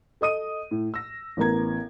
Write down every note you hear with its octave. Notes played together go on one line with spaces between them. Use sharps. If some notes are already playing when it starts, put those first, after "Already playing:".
A4 D#5 D#6 D#7
A2
E6 A#6
A1 B3 A#4 A#5 G#6